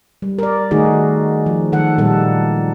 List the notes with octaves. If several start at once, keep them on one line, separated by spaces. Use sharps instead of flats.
G3
A#4 D5
D#3 A3 D#4 F#4 G#4
F3
D#3 F#3 A4 F#5
A#2 G3 A#3 A4